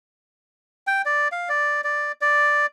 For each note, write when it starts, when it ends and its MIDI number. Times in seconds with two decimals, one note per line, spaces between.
0.87 1.02 79
1.06 1.28 74
1.32 1.49 77
1.49 1.81 74
1.84 2.12 74
2.21 2.66 74